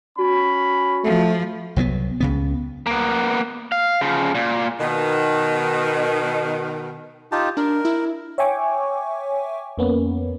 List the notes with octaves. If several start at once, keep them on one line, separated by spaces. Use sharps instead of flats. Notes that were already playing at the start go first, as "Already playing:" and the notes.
C#4 F#4 B5
F3 A3
C2 F#3 G3 B3
C#2 C#3 B3
A#3 B3
F5
C#3 F3
A#2
B2 D#3
D#4 F4 G4 A5
D4 A#4
E4
C#5 E5 G5 G#5 C#6 D6
F2 A#3 B3 C#4